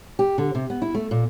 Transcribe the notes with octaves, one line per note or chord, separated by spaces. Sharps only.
G4
D3
C3
B3
E4
A3
A#2